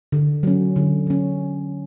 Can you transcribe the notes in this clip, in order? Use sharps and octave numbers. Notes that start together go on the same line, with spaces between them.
D3
F#3 C#4
D3
F#3 C#4